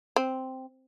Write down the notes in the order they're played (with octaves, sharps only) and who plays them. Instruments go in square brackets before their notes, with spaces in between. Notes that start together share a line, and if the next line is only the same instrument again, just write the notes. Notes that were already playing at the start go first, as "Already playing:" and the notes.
[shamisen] C4